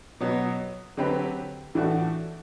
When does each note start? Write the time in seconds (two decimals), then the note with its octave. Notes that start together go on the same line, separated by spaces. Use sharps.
0.20 B2 F#3 B3 F#4
0.97 D3 F#3 C4 G4 B4
1.75 A2 E3 A3 D4 F#4